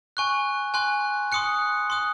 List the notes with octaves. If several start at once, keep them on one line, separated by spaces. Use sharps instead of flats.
G#5 C#6 F#6
G#5 C6 F#6
C6 D#6 F#6 C#7
C6 D#6 F#6